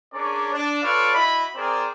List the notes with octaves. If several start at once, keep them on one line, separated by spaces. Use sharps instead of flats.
C#4 D4 G#4 A#4 C#5 D5
D4
F4 A4 B4 C#5 D5 F5
E4 F#4 D#5 B5
C4 G#4 A#4 C5 D5